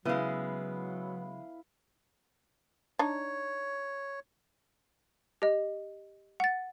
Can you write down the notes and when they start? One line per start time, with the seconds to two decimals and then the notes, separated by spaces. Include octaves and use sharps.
0.05 C#3 F#3 G#3 B3 E4 F5
2.99 D4 D#4 C#5
5.42 G4 D#5
6.40 F#5 A6